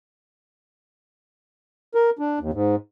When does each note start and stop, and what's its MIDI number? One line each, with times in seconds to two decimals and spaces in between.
1.95 2.10 70
2.19 2.39 62
2.40 2.51 39
2.53 2.75 44